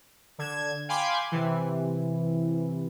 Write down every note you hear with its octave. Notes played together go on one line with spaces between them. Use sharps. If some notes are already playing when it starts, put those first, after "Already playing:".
D3 G#6 E7
F5 G5 G#5 B5 C6 D6
C3 E3